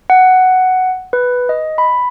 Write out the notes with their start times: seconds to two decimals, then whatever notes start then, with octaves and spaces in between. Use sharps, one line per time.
0.10 F#5
1.13 B4
1.49 D#5
1.78 B5